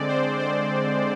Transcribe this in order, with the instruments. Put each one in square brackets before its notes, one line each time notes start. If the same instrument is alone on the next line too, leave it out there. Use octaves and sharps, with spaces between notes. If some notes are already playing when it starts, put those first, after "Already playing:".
Already playing: [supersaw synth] D3 G#3 C4 D5
C5
C5